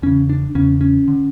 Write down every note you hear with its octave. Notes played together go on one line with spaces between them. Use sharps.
E2 C#3 C#4
D4
E2 C#3 C#4
C#4
D3